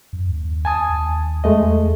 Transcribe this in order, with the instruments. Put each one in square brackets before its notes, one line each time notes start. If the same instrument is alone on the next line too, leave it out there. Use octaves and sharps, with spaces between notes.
[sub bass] F#2
D#2
[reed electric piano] G#5 A5 D#6
[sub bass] D#2
[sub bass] E2 [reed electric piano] G#3 A3 D#5